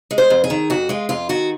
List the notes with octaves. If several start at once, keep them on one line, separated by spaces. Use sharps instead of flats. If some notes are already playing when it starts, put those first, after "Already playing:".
G#3
C5
F2
G#4
D#3
F2 F#4
G#3 F4
F2 F4
D#3 F#4